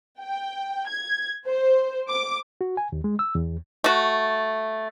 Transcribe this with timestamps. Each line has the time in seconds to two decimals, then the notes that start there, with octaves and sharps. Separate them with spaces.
0.21 G5
0.88 G#6
1.48 C5
2.09 D6
2.61 F#4
2.77 G#5
2.92 D#2
3.04 G#3
3.19 E6
3.35 E2
3.84 A3 F#4